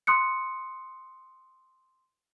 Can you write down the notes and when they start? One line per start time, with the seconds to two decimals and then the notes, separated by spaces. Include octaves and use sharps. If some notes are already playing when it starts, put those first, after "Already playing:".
0.07 C6 D#6 F#6 C#7